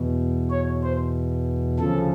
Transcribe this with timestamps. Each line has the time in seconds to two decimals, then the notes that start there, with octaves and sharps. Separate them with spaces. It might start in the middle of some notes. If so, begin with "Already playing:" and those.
Already playing: E2 B2
0.50 C#5
0.83 C5
1.79 D2 C#3 F3 A4